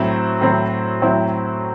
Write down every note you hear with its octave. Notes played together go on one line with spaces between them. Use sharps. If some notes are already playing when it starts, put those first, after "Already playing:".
Already playing: A2 F#3 C4 E4
A2 F#3 C4 E4
A2 F#3 C4 E4